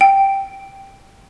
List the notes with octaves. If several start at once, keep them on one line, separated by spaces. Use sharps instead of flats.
G5